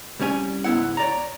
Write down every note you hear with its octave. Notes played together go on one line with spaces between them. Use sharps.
C2 G3 C#4 G#5
C#2 G#2 B3 E4 F#5
C#5 D5 A#5